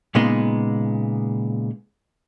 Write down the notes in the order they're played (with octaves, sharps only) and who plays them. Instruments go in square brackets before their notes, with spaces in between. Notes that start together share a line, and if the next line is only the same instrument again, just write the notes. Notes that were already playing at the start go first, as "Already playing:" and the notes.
[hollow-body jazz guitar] A#2 C#3 G#3 B3 D#4 C6